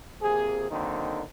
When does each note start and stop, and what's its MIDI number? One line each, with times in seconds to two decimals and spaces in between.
0.21 0.69 41
0.21 0.69 48
0.21 0.69 58
0.21 0.69 68
0.70 1.22 50
0.70 1.22 51
0.70 1.22 54
0.70 1.22 58
0.70 1.22 60
0.70 1.22 63